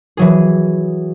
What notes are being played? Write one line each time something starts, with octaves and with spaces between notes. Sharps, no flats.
E3 F#3 G#4